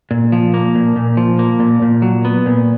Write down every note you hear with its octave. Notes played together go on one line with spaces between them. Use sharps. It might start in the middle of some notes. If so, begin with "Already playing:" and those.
A#2
F3
A#3
A#2
A#2
F3
A#3
A#2
A#2
F#3
B3
A#2